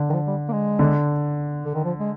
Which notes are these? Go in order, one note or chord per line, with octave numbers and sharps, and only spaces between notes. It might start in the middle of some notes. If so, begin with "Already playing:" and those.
Already playing: D3
D#3
F3
G3
A#3
G#3
D3
D3
D#3
F3
G#3